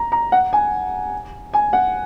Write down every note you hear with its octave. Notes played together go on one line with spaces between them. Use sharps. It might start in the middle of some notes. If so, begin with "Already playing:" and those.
Already playing: A#5
A#5
F#5
G#5
G#5
F#5